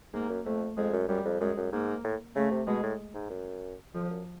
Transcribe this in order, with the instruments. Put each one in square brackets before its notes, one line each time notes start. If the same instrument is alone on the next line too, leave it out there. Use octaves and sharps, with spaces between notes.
[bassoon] G#2 [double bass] A#3
[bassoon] F#2
[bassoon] F2 [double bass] A3
[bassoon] F2 [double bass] G#3
[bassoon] F#2
[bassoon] F#2 [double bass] G3
[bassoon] F2
[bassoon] F#2 [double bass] G#3
[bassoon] F#2
[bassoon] G#2 [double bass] A#3
[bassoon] A2
[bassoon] C#3 [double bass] A3
[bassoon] C3
[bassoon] B2 [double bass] G#3
[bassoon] A2
G#2
F#2
[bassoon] F2 [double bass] F3
[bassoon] F#2